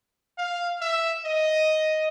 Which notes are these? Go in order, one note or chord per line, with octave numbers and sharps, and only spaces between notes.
F5
E5
D#5